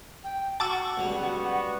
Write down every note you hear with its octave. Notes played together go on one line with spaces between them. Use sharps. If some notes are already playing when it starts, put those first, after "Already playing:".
G5
F#4 F#5 A5 C#6 D6 E6
C#2 F#3 G3 B3 F#4